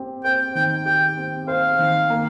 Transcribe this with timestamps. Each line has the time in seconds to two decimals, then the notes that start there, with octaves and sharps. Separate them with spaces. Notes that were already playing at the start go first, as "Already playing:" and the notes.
Already playing: C4 G4
0.24 C5 G5
0.55 D#3 G5
0.85 G4 G5
1.17 C4
1.48 C5 F5
1.79 D#3
2.10 A#3